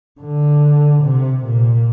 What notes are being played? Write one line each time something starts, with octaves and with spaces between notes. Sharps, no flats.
D3
C3
A#2